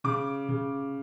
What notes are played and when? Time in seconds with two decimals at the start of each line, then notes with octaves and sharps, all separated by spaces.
0.04 C#3 D6
0.49 C#3